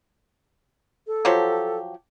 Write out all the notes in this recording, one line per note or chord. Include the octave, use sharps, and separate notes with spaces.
A4
F3 F#3 G4